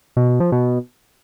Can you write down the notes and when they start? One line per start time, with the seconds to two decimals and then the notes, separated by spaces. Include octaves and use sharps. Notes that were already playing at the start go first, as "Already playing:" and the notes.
0.17 B2
0.28 B2
0.40 F3
0.52 B2